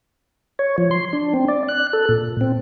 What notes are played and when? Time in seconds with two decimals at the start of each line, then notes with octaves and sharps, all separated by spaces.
0.59 C#5
0.78 F3
0.91 C6
1.13 D4
1.34 C4
1.48 D5
1.68 F#6
1.93 A4
2.09 A#2
2.41 C4